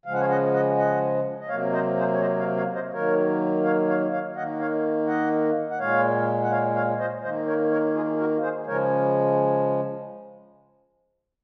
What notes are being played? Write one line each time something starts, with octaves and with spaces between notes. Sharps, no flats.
C#3 F3 G#3 F5
F#5
C#5 F5
D#5 F#5
D#5 F#5
D#5 F#5
D#5
C3 F#3 A#3 C#5 F5
C5 D#5
G#4 C5
C#5
C5 D#5
C#5 F5
C#5 F5
C5 D#5
D#3 F#3 A#3 A#4 C#5
C#5 F5
C#5 F5
C#5 F5
D#3 A#3 D#5 F#5
C#5 F5
D#5 F#5
F#5
A#2 G#3 C#5 F5
F#5
C#5 F5
C#5 F5
C5 D#5
D#3 A#3 C5 D#5
A#4 C#5
A#4 C#5
F4 G#4
F#4 A#4
G#4 C5
C#3 F3 G#3 A#4 C#5